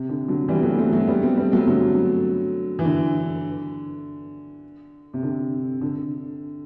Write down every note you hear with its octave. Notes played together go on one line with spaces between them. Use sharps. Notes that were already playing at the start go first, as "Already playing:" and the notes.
Already playing: C3
D3
D3 F#3
E3 G3
B3
F#3 A3
A3 C4
F#3 A3
G3 B3
A3 C4
G3 B3
F#3 A3
D3 F#3
E3
D3
C3
D3
D3